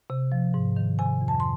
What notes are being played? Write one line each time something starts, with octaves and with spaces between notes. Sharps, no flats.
C3
F3
G#2
D#3
C3 G#5
F2
A5
C6